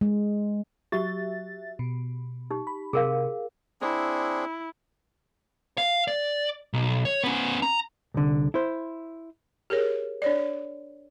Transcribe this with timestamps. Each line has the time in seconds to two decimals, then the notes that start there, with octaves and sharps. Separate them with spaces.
0.01 G#3
0.92 F#3 F#4 G4 E5 A6
1.79 B2
2.51 D#4 G4
2.67 B5
2.93 C3 G#4 A#4 F5
3.81 C4 D4 E4 G#4
5.78 F5
6.08 D5
6.73 B1
7.05 C#5
7.24 B3 C#4
7.62 A#5
8.14 C2 D3
8.54 E4 C5
9.70 G4 G#4 A#4 C#5
10.22 D4 C#5 D5